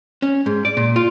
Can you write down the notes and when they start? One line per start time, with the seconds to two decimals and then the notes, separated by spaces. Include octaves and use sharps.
0.22 C#4
0.46 G#2
0.65 D5
0.77 A#2
0.96 F4